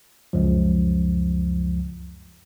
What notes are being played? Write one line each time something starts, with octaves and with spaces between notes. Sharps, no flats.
C#2 F#2 F3